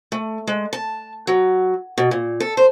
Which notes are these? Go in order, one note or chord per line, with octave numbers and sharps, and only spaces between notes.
A3
G#3
A5
F#3
B2
A#2
A4
C5